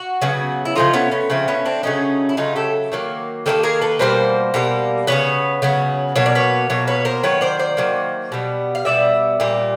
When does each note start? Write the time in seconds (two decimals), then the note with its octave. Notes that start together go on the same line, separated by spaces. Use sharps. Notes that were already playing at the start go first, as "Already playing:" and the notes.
Already playing: F#4
0.22 C#3 F#3 B3
0.65 E4
0.75 C#3 F3 A3 D#4 F4
0.93 B3 C#4
1.11 B3 C#4
1.30 C#3 F3 A3 C4
1.48 B3 C#4
1.65 C4 D4
1.83 C#3 F#3 A3 C#4 D#4
2.29 E4
2.37 C#3 F#3 A3 D#4 F4
2.56 G4 A4
2.92 D#3 F#3 A#3
3.46 D#3 F#3 A#3 G4 A4
3.63 G#4 A#4
3.81 A4 B4
3.99 B2 G3 A#3 A#4 C5
4.54 B2 G3 A#3
5.07 C#3 F#3 B3 B4 C#5
5.62 C#3 F#3 B3
6.16 B2 F#3 A#3 C#5
6.26 D5
6.35 B4 C#5
6.70 B2 F#3 A#3 C#5
6.87 B4 C#5
7.05 A#4 C5
7.23 D#3 F#3 A#3 B4 C#5
7.41 C5 D5
7.59 C5 D5
7.77 D#3 F#3 A#3
8.32 B2 G3 B3
8.75 F5
8.85 B2 G3 B3 D5 E5
9.40 A#2 G3 A#3